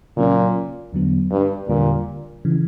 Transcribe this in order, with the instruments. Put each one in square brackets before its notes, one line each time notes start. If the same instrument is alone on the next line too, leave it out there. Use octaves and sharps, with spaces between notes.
[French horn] A#2 [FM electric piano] C#3 F#3 C#4
[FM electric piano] E2 D3 F#3 B3
[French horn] G2
[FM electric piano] E2 D3 G3 [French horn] A#2
[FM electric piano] C#3 E3